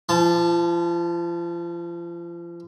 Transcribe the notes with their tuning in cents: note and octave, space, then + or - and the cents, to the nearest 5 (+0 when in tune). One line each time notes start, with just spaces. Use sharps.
F3 -35 A5 -5